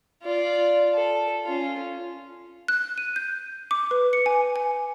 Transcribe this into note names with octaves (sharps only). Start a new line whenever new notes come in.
F4 D5
A4
C#4 F4
F#6
D#7
G6
D6
B4
C#7
G#5
G#5